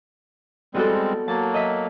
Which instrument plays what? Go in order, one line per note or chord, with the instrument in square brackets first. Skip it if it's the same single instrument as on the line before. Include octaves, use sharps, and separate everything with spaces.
[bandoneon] G3 G#3 C4 [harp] B3 F#4 A4
[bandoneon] F#3 A#3 [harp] A5
[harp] D#5 E5 B6